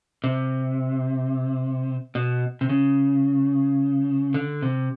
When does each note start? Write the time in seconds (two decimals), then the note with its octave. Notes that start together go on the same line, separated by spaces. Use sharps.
0.24 C3
2.15 B2
2.61 C3
2.69 C#3
4.34 D3
4.62 C3